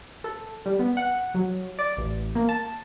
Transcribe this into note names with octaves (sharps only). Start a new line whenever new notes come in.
A4
G3
B3
F#5
F#3
D5
A1
A#3
A5